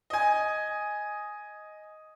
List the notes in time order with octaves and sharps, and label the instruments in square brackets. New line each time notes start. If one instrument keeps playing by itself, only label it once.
[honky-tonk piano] D#5 G#5